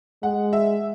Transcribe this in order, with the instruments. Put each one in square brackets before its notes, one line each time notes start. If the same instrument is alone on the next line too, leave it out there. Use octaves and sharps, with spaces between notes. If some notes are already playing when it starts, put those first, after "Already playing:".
[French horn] G#3 [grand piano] F#5
[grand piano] E5